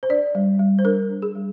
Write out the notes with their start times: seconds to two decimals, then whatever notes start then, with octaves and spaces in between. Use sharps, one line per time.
0.03 C5
0.09 D4 D5
0.35 G3
0.59 G3
0.79 C5
0.84 D4 A#4
1.10 D4
1.22 G#4
1.35 G3